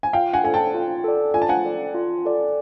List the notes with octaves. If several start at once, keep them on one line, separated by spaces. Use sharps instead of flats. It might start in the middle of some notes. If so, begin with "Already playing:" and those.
G#5
F4 F5 G5
F#5 G#5
A4 D5 G#5
G5 A5
F4
A4 D5
F4 G#5
A5
F#5 G#5
A4 D5
F4
A4 D5